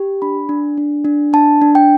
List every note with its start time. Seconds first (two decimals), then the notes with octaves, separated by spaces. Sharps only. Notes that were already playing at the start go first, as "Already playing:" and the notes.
Already playing: G4
0.22 D4 B5
0.49 D4
0.77 D4
1.05 D4
1.33 D4 A5
1.62 D4
1.75 G5